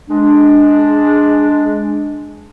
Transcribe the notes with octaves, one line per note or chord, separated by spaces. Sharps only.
G#3 D4